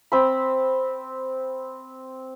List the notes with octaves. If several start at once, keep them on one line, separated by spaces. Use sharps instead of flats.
C4 B5